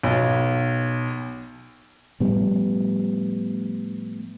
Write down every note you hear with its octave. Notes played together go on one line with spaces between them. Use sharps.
B1
A2 F3 G3 B3